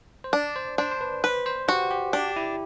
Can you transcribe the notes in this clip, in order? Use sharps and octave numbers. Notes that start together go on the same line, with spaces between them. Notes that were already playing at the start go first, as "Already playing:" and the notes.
C5
D4 D5
C5
D4 C5
C5
B4
B4
C5
F#4 G4
G4
D4 G4
E4